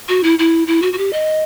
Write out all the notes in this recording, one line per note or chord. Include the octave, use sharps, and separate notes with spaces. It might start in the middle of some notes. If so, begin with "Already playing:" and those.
F#4
E4
E4
E4
F#4
F#4
G4
D#5